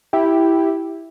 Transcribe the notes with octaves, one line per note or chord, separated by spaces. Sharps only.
E4 G4